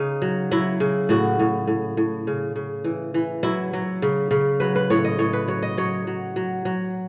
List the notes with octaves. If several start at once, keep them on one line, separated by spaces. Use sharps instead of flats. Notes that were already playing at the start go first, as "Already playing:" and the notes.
Already playing: C#3 D#4
F#3
F#3 E4
C#3
A2 F#4
A2
A2
A2
C#3
C#3
E3
E3
F#3 E4
F#3
C#3
C#3
F#3 B4
B4
A2 C#5
D#5
A2 C#5
B4
F#3 C#5
D#5
F#3 C#5
F#3
F#3
F#3